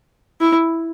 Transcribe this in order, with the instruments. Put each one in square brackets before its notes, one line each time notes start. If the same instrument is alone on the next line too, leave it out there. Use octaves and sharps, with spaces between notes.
[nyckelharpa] E4